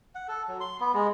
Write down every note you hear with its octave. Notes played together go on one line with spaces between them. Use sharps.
F#5
A4
F#3
C6
B3
G#3